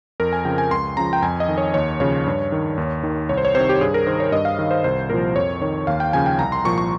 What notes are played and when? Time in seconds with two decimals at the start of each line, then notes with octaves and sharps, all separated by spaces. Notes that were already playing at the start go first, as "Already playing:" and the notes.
0.20 F2 A#4
0.33 G#5
0.45 C#3 F3 G5
0.58 G#5
0.71 C#2 C6
0.97 C#3 F3 A#5
1.13 G5
1.22 F2 G#5
1.40 D#5
1.48 D#3
1.58 C#5
1.74 D#2 C#5
2.00 C#3 F3 C#5
2.26 G2
2.52 D#3
2.78 D#2
3.03 D#3
3.29 C2 C#5
3.37 C5
3.45 C#5
3.55 C3 D#3 C5
3.69 G4
3.81 G2 G#4
3.94 A#4
4.07 D#3 C5
4.20 C#5
4.32 G2 D#5
4.45 F5
4.59 D#3
4.71 C5
4.84 C2 C5
5.10 A#2 F3 A#4
5.36 F2 C#5
5.61 D#3 C#5
5.87 D#2 F5
6.00 G5
6.13 C#3 F3 G#5
6.26 G5
6.39 C2 A#5
6.52 C6
6.65 A#2 F3 C#6
6.78 C#6